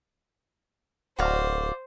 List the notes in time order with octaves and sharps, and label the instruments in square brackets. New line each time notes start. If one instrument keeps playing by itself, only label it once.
[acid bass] D1 [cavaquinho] F#4 D5 F5 [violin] C5